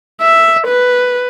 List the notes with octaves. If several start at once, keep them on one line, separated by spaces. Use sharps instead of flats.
E5
B4